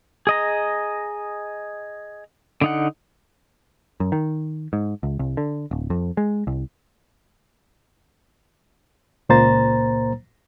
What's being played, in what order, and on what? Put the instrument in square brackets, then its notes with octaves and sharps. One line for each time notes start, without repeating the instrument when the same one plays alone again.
[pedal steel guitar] G#4 D#5 A#5
D3 D#4 F#5
[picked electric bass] F#2
D#3
G#2
C#2
C2
D3
D1
F2
G#3
C2
[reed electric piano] C#2 A#2 A#3 C5 A#5 A6